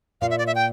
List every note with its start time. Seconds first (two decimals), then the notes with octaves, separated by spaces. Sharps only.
0.21 A#2 A#3 F5
0.30 E5
0.39 D5
0.47 E5
0.55 G5